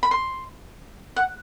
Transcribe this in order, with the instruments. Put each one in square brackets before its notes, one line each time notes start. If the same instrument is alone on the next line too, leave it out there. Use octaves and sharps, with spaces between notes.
[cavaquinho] B5
C6
F#5